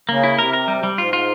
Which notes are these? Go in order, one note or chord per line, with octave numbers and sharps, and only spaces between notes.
C#3 A#3
E4
C3 A#4
A#4
G3
G3
G#2 F4
F4